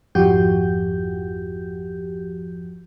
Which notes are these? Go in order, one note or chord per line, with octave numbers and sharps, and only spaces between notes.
G#1 F2 F3 F#4 G4 G6